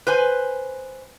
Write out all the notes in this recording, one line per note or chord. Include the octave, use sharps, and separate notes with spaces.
B4 C5 G#5